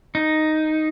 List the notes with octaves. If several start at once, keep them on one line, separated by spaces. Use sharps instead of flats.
D#4